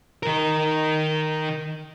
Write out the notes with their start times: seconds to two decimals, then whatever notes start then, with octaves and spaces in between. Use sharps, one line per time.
0.23 D#3 A#4